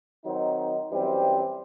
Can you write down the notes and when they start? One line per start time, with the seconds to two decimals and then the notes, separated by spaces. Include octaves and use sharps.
0.25 D#3 F#3 C4 D#4
0.91 F#2 E3 G3 C4